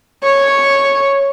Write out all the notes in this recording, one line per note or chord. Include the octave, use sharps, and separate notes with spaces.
C#5